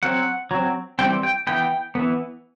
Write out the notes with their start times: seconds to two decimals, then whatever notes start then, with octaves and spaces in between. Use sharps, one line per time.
0.03 F#3 C4 F#5
0.51 F#3 C4
0.99 E3 G3 C4 G5
1.23 G5
1.47 E3 B3 G5
1.95 E3 B3